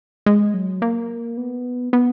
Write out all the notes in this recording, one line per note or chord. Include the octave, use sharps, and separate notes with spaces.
G#3
F#3
A#3
B3
B3